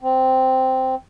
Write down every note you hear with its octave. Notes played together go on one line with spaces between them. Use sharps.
C4